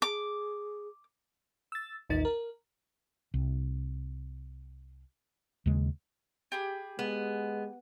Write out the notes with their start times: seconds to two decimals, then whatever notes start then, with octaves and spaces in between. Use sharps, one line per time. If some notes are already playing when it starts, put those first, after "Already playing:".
0.02 G#4 D6
1.72 E6 A6
2.10 A1 D#2 D#4 A6
2.25 A#4
3.34 C2
5.66 D#2 C#3 G#3
6.52 G4 G#4 B5
6.99 G#3 B3